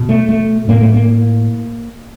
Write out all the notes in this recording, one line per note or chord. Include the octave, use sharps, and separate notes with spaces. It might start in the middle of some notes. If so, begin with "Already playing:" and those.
Already playing: B2
A3
A3
A2 A#3
A3
A#3